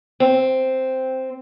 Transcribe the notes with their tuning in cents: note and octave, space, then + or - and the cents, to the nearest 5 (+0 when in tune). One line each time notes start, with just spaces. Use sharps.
C4 -5